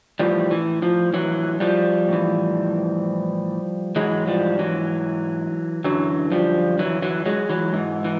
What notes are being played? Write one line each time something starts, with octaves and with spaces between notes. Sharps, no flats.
A2 E3 F3 G3
E3
F3
E3 F#3
F3 G3
A2
E3
G#2 E3 F#3 G#3
F3 G3
E3 F#3
F#2 D3 E3 F#3
F3 G3
E3 F#3
E3 F#3
F#3 G#3
E3 F#3
G#2 E3
E3